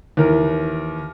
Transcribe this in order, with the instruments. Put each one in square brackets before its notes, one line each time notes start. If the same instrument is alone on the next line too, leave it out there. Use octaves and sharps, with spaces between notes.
[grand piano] D#2 E3 A#4